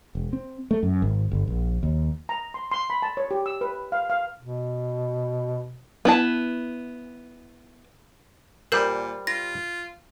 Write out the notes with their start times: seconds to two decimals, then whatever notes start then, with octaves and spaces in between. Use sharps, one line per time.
0.15 E1
0.33 C4
0.71 A3
0.83 F#2
1.02 G#1
1.31 G1
1.48 A#1
1.83 D#2
2.29 A#5
2.54 C6
2.71 C6
2.90 B5
3.02 A5
3.17 C#5
3.31 G4
3.46 E6
3.61 B4
3.92 F5
4.10 F5
4.40 B2
6.05 B3 E4 A5
8.72 A#2 G3 A#4 C5 G6
9.27 F4 A#6